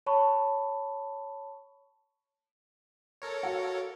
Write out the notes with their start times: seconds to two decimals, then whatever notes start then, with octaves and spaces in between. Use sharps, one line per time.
0.06 C#5 A5 B5 C#6
3.22 A4 A#4 C#5
3.43 F#4 F5 F#5